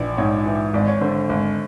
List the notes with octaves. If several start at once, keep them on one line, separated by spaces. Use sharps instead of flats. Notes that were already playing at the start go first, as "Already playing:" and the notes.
Already playing: A#1 E3 D5
G#2 C#5
E3
G#1 D5
C#5
D3 C5
G#1